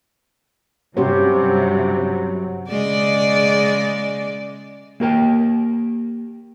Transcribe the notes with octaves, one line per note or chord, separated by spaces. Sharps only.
G2 C3 F#3 C#4 G4 C5
C#3 G#3 D5
A#3 G4 A#4 G5